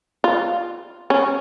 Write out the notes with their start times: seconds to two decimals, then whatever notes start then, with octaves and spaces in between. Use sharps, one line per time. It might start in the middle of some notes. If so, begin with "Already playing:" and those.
0.24 F4
1.10 C#4